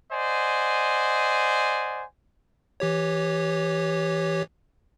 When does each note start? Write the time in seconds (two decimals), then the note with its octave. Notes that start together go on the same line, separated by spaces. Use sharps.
0.12 C5 D5 D#5 F#5 G#5
2.80 E3 G4 C#5